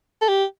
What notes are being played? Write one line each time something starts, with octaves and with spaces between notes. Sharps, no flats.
A4
G4